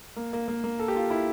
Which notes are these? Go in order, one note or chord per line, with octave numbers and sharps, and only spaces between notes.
A#3
A#3
A#3
A#3
A4
G4
F4
E4